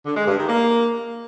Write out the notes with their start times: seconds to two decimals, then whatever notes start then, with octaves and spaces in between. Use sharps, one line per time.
0.06 D3
0.17 G#3
0.27 G2
0.38 D#3
0.49 A#3